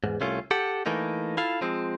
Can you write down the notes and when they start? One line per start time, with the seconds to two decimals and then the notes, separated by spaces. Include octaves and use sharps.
0.04 E2 G#2
0.21 C2 A3 C#4 F4
0.51 G4 A4 F#5
0.86 E3 A3 A#3 D#4
1.37 E4 F4 A4 F5
1.61 F3 G#3 C4